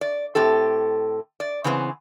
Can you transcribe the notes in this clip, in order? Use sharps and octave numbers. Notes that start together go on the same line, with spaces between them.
D5
A2 C4 G4 A4
D5
C#3 E3 B3 C4